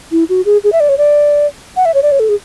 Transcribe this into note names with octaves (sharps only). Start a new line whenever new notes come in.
E4
F#4
G#4
G#4
E5
D5
C#5
D5
F#5
E5
C#5
D5
C#5
A4
G#4